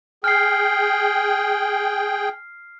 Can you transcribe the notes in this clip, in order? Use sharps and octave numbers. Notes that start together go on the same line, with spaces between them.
G#4 G5 F6 C7